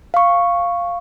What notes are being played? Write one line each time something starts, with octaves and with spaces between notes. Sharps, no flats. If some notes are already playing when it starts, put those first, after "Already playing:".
F5 C#6